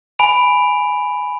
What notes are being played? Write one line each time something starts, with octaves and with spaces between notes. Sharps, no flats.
G#5 B5 D7 F7